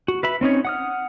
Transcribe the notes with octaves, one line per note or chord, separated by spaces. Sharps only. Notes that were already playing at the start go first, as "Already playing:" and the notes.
F#4
B4 E5 B5
C4 C#4 D#4 C#5
F#5 D#6 F6